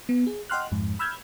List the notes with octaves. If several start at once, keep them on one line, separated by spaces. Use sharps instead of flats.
B3
G#4
D#5 F#5 G5 C6 F6 F#6
F2 G#2
B5 E6 F6 G6 G#6